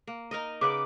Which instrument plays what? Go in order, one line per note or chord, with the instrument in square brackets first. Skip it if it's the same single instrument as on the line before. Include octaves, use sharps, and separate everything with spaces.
[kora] A#3
D#4 A#4 D#5
[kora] C#3 B4 F#5 [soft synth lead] D6